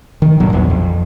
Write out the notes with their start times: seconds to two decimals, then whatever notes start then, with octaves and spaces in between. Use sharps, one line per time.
0.22 D#3
0.40 A1 G2 A#2 F#3
0.53 A#1 E2
0.70 F2